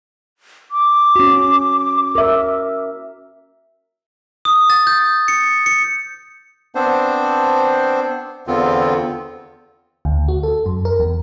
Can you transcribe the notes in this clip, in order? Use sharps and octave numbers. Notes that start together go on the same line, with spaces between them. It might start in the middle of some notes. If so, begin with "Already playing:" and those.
D6
C#4 F#4
A#4 E5
D#6
A6
G6
C#7
C#7
B3 C4 D4 C5
E2 D3 B3 C4 F4
D2
F#4
A4
F#2
A#4
E2